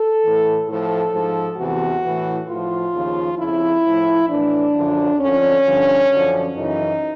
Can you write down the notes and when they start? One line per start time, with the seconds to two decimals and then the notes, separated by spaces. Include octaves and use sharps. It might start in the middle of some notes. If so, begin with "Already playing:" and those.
Already playing: A4
0.22 A2 E3
0.66 A2 F3 A4
1.12 G#2 F3
1.57 E2 C3 E3 F#4
2.03 A2 E3
2.48 A2 F3 F4
2.94 D#2 C#3 F3
3.39 F2 C#3 F3 E4
3.84 A2 F3
4.29 A2 E3 D4
4.75 F#2 D3 F3
5.20 F2 D3 F3 C#4
5.65 G2 D3 F3
6.11 F#2 D3 F3
6.56 F#2 C#3 E3 D#4